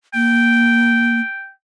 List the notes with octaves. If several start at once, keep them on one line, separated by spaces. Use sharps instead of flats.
A#3 G5